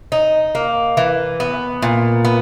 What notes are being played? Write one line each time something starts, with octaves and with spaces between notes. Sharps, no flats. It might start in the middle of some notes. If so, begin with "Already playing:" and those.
D#4
A#3
E3
B3
A#2
B3